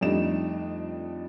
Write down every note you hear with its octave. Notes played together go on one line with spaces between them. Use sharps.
F2 G3 A3 D4 D#4 E7